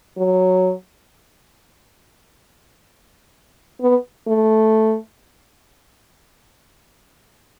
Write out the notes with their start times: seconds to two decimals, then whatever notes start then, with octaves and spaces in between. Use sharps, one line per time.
0.17 F#3
3.82 B3
4.28 A3